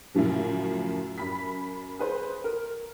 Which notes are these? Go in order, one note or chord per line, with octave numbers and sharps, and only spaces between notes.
F#2 A2 C#3 F3 F#3
F#2 B5 B6
G#4 B4 C5
A#4